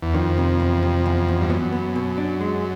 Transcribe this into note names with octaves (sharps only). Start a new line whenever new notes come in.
E2
F2 D#3
C3
E2
C3
E2
E2
G2
F#2 B3
B3
B2
D4
G#3